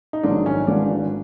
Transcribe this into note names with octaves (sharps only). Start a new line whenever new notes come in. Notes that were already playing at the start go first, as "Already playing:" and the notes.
D#4
A#1 G#2 D#3 F#3 D4
C#4
G#1 G#2 E3 D4